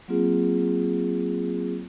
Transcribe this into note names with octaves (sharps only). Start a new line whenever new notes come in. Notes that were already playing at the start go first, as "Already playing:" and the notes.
F#3 A#3 C4 F4 G#4